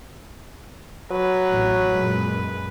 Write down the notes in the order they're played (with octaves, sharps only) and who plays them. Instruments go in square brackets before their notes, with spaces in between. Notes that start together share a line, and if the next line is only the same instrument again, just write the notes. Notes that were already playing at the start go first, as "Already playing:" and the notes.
[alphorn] F#3 [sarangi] B4
[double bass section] A1
F#2 A#2 G#3